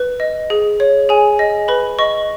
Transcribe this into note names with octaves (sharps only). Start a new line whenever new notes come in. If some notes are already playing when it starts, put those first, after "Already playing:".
Already playing: B4
D#5
G#4
C#5
G#4 G#5
D#5
B4 B5
D#5 C#6